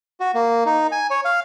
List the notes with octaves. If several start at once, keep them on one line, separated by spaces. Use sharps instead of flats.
F#4
A#3
D#4
G#5
C#5
F5